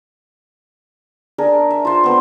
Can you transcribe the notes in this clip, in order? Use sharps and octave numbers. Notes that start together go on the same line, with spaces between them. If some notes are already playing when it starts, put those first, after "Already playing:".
D4 G#4 A#4
E5
F4 C5
A3 B3 C4